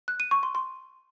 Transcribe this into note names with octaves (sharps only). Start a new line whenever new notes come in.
F#6
D#7
C#6
C6
C6